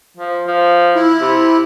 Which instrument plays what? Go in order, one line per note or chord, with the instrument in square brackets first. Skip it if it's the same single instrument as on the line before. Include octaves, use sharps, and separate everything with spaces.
[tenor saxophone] F3
F3
[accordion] E4
[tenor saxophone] C3